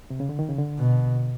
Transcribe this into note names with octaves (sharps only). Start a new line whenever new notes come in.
C3
C#3
D3
D#3
C#3
D3
B2